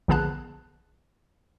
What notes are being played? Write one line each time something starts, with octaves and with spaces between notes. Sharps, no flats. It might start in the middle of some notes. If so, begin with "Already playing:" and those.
A#1 D3 B3 G#4 A5 F#6